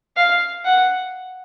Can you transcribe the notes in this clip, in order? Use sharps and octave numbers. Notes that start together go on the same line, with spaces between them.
F5
F#5